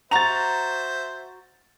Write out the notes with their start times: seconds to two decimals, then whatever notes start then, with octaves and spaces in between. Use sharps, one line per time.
0.11 F#4 C5 E5 A#5 A6 F7